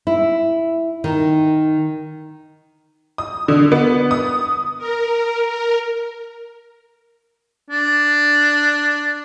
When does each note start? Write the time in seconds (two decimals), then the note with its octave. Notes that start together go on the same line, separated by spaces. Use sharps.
0.07 E4
1.04 D#3
3.18 D#6
3.48 D3
3.72 B3
4.11 D#6
4.78 A#4
5.48 A#4
7.70 D4